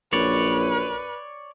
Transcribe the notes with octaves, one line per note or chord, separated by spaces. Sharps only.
A#1 F#2 B4 C#5 D5